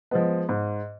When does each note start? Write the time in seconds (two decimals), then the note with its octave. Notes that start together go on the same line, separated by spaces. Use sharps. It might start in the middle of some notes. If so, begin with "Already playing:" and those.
0.11 F3 G#3 B3
0.49 G#2